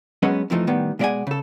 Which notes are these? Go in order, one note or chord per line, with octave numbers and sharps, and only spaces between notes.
F#3 G#3 B3 C#4 B4 D#5
F2 E3 F3 A3 D#4
A2 D#3 G3 B3
B2 G#3 D5 E5 F#5 G#5
C#3 A4